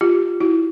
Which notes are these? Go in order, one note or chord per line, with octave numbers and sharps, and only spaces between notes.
F4 G4
E4 F#4